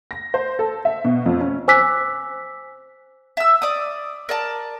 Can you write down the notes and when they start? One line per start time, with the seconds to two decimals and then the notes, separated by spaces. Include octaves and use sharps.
0.11 A#6
0.34 C5
0.59 A4
0.85 E5
1.04 B2
1.26 F2
1.40 C#4
1.68 C5 G#5 D6 E6 F#6 B6
3.37 E5 E6
3.62 D5 D#6
4.29 A#4 D5 A5